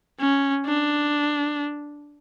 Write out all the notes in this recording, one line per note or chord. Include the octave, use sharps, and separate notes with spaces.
C#4
D4